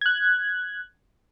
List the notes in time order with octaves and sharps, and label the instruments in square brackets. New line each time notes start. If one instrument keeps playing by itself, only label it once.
[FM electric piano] F#6 G#6